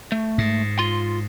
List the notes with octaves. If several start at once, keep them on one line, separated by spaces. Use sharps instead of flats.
A3
G#2
F4 C6